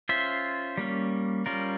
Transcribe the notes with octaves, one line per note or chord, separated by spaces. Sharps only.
C#4 F4 C5 E5
G3 A#3 C#4
G3 C#4 F4 A#4